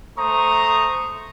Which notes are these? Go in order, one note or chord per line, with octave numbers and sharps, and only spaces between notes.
A3 C5 A#5 C#6 D#6